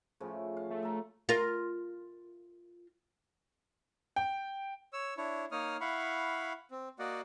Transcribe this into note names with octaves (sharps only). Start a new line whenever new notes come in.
A2 C#3 F3
F5
A3
E5 A#5
F4 A#4
G5
C#5 E6
D4 E4 C#5
A#3 D#4 C#5 D#6 F6
E4 F5 F#5 B5 C#6
C4
A#3 F#4 D5 D#5 F#5